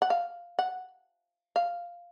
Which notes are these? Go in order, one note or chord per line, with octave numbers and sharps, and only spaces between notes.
F#5
F5
F#5
F5